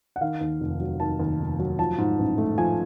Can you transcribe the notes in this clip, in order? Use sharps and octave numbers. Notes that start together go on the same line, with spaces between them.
F#5
D#3 F5
D#2
F1
F#3
D#3 A5
D#2
F1
F#3
F3 A5
G#2
A1
A3
F3 G#5